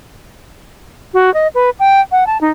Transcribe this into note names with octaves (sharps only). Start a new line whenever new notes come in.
F#4
D#5
B4
G5
F#5
A5
D#4